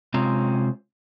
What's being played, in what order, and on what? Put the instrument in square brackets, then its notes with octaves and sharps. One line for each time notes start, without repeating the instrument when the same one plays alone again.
[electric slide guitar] C3 G#3 C4 C#4 F4 A#5